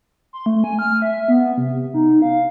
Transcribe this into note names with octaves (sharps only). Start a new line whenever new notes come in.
C6
A3
G#5
F6
E5
B3
C3
D#4
F5